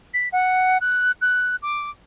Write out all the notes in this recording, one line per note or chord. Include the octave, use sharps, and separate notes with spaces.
B6
F#5
F#6
F#6
D6